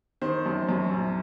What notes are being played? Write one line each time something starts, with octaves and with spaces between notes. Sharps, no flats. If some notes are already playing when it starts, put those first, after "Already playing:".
D#3 C5
F#2
F#2
A#1